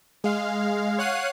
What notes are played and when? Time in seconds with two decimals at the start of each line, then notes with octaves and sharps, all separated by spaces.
0.24 G#3 F5
0.98 C#5 F5 F#5 F#6 C7 D#7